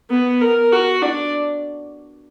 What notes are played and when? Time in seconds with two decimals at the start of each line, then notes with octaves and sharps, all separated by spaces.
0.10 B3
0.41 A#4
0.72 F#4
1.03 D4